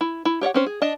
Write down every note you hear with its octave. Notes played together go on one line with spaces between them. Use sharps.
E4
E4
G4 C#5 D5 F#5
C4 C#4 C5
G#4
D4 D#5 A5